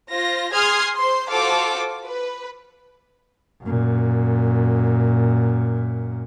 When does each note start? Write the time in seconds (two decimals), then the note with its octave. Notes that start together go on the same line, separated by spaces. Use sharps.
0.11 F4 C5 A#6
0.54 G#4 C6 D#6 F6 G#6 C7
0.98 C5 C6
1.29 F4 F#4 A4 C5 F5 D6
2.06 B4
3.63 F#2 A#2